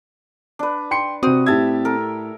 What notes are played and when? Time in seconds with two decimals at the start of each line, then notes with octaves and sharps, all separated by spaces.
0.59 D4 B4
0.91 G5 C6 C#7
1.23 C3 C4 F#4 D#6
1.46 A2 G4 E5 A5 G#6
1.85 A4 A#4